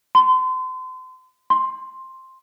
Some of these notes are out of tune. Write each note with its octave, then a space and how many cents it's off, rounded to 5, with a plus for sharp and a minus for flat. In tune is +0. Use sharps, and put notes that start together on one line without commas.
C6 -35
C6 +5